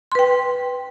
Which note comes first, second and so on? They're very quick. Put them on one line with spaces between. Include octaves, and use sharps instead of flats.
C6 B4 G5